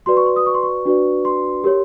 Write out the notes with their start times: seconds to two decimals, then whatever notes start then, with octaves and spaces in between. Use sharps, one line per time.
0.06 F#4 B4 D5 C6
0.17 C#6
0.26 C6
0.36 D#6
0.46 C#6
0.54 C6
0.63 C#6
0.85 D4 F#4 B4 D5
1.25 C6
1.64 G4 A#4 C#5